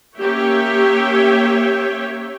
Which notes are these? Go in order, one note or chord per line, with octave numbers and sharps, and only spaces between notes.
A#3 C#4 G4 C#5 E5 G5